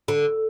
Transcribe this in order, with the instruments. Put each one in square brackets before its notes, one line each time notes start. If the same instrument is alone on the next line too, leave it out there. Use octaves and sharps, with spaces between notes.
[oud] D3